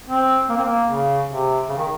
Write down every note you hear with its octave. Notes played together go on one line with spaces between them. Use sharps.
C4
A#3
C4
A#3
C#3
C3
C#3
D#3